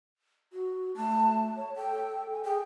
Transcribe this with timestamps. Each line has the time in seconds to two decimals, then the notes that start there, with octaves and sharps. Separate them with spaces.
0.53 F#4
0.97 A3 A5
1.56 C#5
1.76 A4 G5
2.33 G#5
2.45 G#4 G5